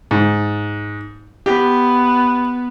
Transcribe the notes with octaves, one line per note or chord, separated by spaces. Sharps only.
G#2
B3 G4